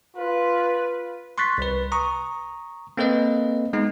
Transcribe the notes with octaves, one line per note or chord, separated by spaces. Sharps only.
F4 B4
C6 C#6 F#6 A6 B6
C2 B4
A#5 C#6 D#6
A#3 C4 A4 B4 D#5
G#3 B3 D#4